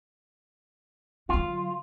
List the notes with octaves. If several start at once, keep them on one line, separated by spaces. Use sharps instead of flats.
D3 F#3 F4